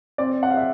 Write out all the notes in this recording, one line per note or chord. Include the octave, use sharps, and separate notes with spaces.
C4 D5
F#5
F5
E5